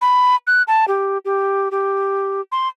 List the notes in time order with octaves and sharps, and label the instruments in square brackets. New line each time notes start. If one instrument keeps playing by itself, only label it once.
[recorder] B5
F#6
A5
G4
G4
G4
C6